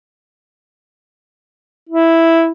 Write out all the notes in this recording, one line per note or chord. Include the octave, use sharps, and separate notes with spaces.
E4